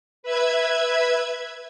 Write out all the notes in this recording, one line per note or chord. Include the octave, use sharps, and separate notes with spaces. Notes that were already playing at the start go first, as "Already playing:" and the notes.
B4 E5 G#6